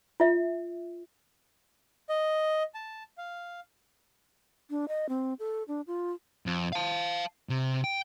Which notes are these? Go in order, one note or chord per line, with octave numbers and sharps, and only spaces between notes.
F4 E5
D#5
A5
F5
D4
D#5
C4
A4
D4
F4
F2
F5 A5
C3
G5